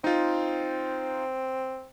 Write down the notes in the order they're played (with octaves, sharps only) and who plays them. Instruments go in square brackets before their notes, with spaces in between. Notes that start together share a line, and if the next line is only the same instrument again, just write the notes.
[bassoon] C4 [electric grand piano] D#4 F4